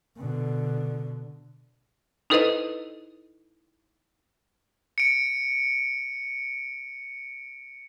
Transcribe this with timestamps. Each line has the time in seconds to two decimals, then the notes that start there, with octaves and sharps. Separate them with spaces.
0.17 B2 D3
2.30 D#4 E4 A4 B4 C5 D#5
4.98 C#7 D7